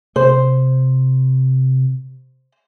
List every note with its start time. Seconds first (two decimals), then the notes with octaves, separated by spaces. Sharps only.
0.16 C3 C5